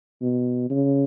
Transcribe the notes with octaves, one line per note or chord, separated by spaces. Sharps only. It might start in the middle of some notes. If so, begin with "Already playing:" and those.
B2
C#3